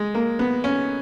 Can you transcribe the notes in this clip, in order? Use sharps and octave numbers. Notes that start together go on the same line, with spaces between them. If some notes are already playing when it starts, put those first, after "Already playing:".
Already playing: G#3
A#3
B3
C#4